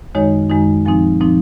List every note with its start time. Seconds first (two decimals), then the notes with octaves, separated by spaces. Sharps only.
0.14 F#2 D#3 G#3 D#4 C#5
0.50 F#2 D#3 G#3 D#4
0.85 A#2 F3 C4 D#4 G#5
1.20 A#2 F3 C4 D#4